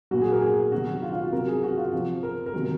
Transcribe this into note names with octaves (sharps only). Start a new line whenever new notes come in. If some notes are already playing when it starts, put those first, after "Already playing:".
A#2 F#3 F#4
G#4
A#4
G#4
C3 D#3 F#3 F#4
F4
F4
F#4
C3 F#3 A#4
G#4
F#4
F4
C3 F3
A#4
A#4
C3 D#3 F#3